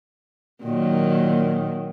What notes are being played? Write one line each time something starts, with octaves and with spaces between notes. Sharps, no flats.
A#2 D#3 F#3